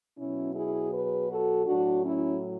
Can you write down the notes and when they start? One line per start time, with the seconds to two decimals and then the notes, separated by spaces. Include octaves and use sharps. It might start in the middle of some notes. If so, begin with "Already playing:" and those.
0.17 B2 F#3 C#4 E4
0.54 E4 G#4
0.92 G#4 B4
1.29 F#4 A4
1.67 A2 F#3 D4 F#4
2.04 C#4 E4